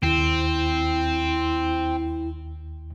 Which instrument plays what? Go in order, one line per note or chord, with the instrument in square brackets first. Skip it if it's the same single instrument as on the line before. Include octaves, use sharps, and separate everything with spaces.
[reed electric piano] D#2 [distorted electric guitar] C4 [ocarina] E4